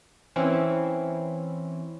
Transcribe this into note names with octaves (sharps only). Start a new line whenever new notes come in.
E3 C4 C#4 E4